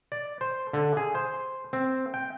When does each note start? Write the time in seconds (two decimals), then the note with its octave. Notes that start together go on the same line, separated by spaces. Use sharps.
0.12 D5
0.41 C5
0.73 D3
0.97 G#4
1.15 C5
1.73 C4
2.14 G5